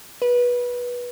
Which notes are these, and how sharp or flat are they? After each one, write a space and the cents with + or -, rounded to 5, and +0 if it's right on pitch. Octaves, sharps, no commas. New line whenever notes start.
B4 -20